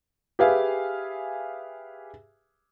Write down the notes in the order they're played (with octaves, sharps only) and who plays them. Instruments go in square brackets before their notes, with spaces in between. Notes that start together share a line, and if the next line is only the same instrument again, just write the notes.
[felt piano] G4 G#4 B4 E5 F5 G#5